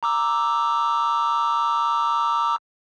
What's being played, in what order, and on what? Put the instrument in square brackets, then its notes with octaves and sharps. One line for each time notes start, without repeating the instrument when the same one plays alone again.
[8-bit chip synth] A#5 D6 E6